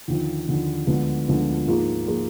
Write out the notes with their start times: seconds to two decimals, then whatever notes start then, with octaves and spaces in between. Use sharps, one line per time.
0.08 D#2 D3 F3
0.48 D#2 D3 F3
0.87 D2 D3 F3 G#3 B3
1.27 D2 D3 F3 G#3 B3
1.67 G#2 F3 A#3 F4 G#4
2.07 F3 A#3 F4 G#4